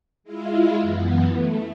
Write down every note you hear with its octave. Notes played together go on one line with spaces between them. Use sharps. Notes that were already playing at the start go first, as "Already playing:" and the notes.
G#3 E4 F4
F#2 E3 B3
A3